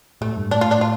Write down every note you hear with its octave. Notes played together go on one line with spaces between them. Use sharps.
A2 A3
G2
A2 D4
F4
D4
F4